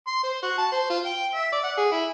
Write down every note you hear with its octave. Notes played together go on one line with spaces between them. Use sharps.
C6
C5
F#4
A5
C5
F4
G5
E5
D5
F#5
G#4
E4